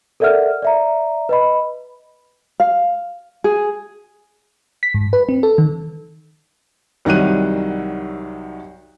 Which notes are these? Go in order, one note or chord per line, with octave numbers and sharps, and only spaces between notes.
A4 A#4 D5 E5 F#5 F6
D5 E5 A#5
B4 D#5 B5
F5
G#4
B6
G#2
B4
C4
A4
D#3
C2 D#3 F#3 G3 F#6 D#7